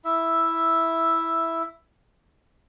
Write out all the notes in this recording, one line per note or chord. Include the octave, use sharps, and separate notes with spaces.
E4 E5